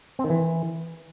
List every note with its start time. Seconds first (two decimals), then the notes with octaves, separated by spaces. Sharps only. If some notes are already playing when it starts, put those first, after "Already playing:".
0.19 C4
0.24 D#3
0.30 E3